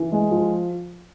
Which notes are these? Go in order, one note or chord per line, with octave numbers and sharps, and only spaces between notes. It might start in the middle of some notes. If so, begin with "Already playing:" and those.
Already playing: E3
G#3
F3